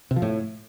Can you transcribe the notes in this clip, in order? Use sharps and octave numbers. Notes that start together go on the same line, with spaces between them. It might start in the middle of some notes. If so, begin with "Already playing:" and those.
C3
F3
A2